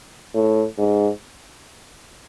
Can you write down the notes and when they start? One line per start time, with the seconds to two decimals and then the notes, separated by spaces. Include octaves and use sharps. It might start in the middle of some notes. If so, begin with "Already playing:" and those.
0.34 A2
0.78 G#2